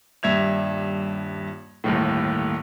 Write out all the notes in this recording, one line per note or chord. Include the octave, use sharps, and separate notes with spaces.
D#1 G2 E5 G#6 F7
G1 D#2 A2